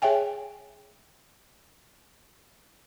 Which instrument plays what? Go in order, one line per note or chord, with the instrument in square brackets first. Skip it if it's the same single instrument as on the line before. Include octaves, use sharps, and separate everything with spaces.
[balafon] G#4 C#5 E5 G5 G#5